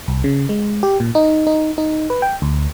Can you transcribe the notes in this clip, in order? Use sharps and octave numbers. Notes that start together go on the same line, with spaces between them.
C2
C#3
G#3
G4
A#2
D#4
D#4
D#4
B4
G5
D2